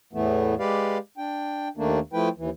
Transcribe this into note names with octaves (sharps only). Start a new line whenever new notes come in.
E2 A2 E3 A3 B3
G#3 G4 B4 D5 F5
D4 G5
D#2 D#3 A3 A#3 D4
F3 A3 E4 B4 G5
D#2 E3